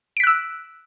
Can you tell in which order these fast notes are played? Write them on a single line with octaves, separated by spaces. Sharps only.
D7 B6 F#6 E6